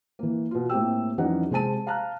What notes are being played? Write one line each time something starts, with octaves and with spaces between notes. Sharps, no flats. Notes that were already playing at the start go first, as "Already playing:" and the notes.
E3 A#3
B2 F4
A2 A#3 C4 G4 G5 E6
F2 E3 G3 C#4 D#4 F#5
C3 G#3 C5 G#5 A5 D#7
F5 A5 A#5 F6 F#6